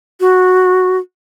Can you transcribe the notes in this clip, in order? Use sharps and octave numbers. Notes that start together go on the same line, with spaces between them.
F#4